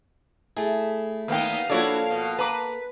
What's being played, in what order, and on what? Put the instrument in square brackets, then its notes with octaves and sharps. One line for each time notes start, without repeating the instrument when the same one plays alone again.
[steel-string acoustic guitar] A3 E4 [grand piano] G#4
[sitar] D#2 B3 D#4 [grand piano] A#3 G5 [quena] F5
[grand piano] F3 C#5 D5 [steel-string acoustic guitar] A#3 A4 [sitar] D4 E4 F#4
[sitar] B2
[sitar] B4 [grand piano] A5 A#5 D6